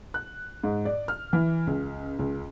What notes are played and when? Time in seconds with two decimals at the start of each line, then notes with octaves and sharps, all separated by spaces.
0.14 F#6
0.64 G#2
0.85 D5
1.08 F6
1.33 E3
1.67 C#2
2.19 C#2